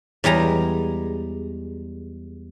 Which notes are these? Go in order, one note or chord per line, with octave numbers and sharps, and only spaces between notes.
E2 G3 G#3 A#5